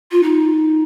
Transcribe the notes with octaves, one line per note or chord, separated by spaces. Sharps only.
F4
D#4